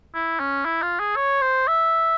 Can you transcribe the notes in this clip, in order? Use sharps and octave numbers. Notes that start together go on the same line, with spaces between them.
E4
C#4
E4
F4
G#4
C#5
C5
E5